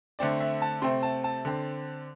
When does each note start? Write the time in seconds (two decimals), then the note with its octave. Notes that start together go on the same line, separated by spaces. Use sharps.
0.19 D3 A3 C4 D5
0.40 E5
0.62 A5
0.82 C3 A3 C4 C6
1.03 A5
1.24 A5
1.45 D3 C4